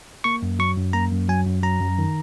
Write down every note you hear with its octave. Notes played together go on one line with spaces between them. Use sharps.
A#3 C#6
F#2
F#3 C#6
F#2
A#3 A#5
F#2
F#3 G#5
F#2
F#3 A#5
F#2
D#3